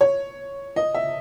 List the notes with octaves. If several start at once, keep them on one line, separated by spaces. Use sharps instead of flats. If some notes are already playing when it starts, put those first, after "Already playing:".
C#5
D#5
E5